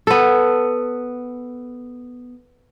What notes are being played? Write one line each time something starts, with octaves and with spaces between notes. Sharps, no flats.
B3 A4